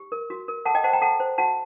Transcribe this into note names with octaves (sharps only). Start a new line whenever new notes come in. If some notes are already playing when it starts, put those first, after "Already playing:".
Already playing: G4
A#4
F#4
A#4
A4 F#5 A5
D#5 G5
C5 F#5 A5
G5 A#5
A4 F#5 A5
C5
F#4 F#5 A5